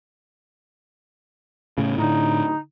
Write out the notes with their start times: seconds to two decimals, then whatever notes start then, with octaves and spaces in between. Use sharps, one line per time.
1.78 A2 C#3
1.98 A2 D3 D#4